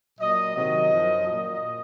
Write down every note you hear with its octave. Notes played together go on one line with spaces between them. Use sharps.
A#2 F#3 D#5
C3 D#3 F#3 D#5
F#2 F3
A#2 F#3 D#5